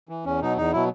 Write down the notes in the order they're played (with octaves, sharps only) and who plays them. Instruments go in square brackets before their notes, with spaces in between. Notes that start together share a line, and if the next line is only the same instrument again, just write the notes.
[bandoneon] E3
E2 C#4
B2 F#3 D#4
E2 D#4
B2 F#3 E4